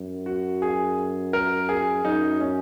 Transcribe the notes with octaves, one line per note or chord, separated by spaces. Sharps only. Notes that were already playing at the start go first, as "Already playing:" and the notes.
Already playing: F#2
F#4
G#4
A#4
G#4
F#2 D#4
C#4